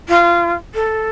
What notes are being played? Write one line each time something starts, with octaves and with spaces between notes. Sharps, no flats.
F4
A4